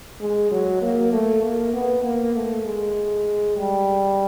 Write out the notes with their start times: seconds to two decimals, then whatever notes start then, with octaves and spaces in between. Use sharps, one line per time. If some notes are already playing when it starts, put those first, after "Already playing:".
0.21 G#3
0.52 F#3
0.82 A#3
1.12 A3
1.44 A#3
1.74 B3
2.04 A#3
2.35 A3
2.65 G#3
3.57 G3